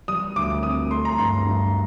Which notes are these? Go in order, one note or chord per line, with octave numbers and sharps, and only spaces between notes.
G3 D#6
D2 D6
C4 D#6
A3 C6
A#5
G2 C6
G2